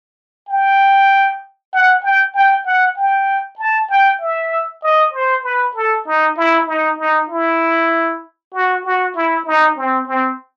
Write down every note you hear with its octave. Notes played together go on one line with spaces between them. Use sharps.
G5
F#5
G5
G5
F#5
G5
A5
G5
E5
D#5
C5
B4
A4
D#4
E4
D#4
D#4
E4
F#4
F#4
E4
D#4
C4
C4